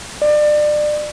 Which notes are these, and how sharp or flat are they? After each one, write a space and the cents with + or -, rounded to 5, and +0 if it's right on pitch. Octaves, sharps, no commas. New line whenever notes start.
D5 +30